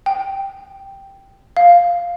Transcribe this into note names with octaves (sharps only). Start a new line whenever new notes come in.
G5
F5